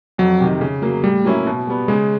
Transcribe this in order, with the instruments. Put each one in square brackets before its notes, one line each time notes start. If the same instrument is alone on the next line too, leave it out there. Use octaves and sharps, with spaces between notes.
[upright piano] F2 [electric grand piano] F#3
[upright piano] C3 D#3
C#3
F#3 A#3
[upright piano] A2 [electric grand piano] G3
[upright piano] F#3 A#3 C#4 E4
B2
G3 B3
[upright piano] C#3 [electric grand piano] G#3